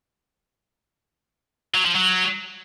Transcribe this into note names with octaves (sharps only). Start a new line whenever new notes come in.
F#3
F3
F#3